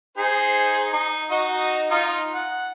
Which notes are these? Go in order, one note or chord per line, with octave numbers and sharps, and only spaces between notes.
D#4 G#4 C5
D#4
D#4 F#4 D#5
D#4 F4
F#5